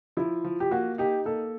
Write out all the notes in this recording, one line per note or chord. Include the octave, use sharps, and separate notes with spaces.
F3 E4
F3
G4
A#3 F#4
D#4 G4
A#3 A4